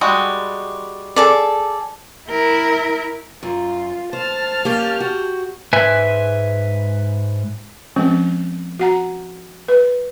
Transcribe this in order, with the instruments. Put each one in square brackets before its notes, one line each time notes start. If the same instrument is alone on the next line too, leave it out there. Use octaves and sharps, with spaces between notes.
[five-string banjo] G3 G#3 F#4
[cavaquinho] G#4 A4 D5
[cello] E4 A#4
[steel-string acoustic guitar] F#2 [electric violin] F4
[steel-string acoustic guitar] C5 [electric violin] A5 F6
[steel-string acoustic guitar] A#3 C#4 [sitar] G4
[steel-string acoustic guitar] F#4
[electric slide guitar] G#2 B4 E5 G#5
[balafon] F3 G#3 C4 C#4
F#4 F#5 A#5
B4